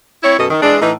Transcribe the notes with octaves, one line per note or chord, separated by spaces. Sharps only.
C4 E4 C#5
F#2 B2 A4 D#5
D#3
E3 G#3 D4
A2 E3 D#4